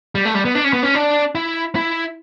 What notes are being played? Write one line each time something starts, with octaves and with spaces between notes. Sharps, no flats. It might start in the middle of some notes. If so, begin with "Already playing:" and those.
G3
A3
G3
B3
D4
C#4
B3
C#4
D4
E4
E4